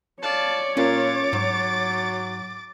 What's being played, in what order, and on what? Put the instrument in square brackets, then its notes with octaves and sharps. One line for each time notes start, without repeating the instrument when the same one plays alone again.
[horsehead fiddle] C#5 [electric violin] D5 [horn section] F5 A5
[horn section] A#2 [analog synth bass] C#4 [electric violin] D6 A6
[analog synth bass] G#2 [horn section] F#3